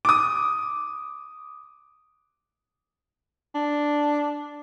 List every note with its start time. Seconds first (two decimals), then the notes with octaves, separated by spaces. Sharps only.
0.05 D6 D#6
3.55 D4